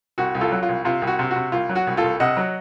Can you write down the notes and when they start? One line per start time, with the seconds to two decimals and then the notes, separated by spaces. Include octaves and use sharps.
0.18 C2 F#4
0.35 C2
0.41 F4 A4
0.51 F#3
0.63 F4
0.69 C2
0.85 C3 F4
1.02 C2
1.07 F#4
1.19 C3
1.31 F#4
1.36 C3
1.52 C2 F4
1.69 F#3
1.75 F#4
1.87 C2
1.97 F4 A4
2.04 C2
2.20 C3 D#5 F#5
2.37 F#3